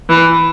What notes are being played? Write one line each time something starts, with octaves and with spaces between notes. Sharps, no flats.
E3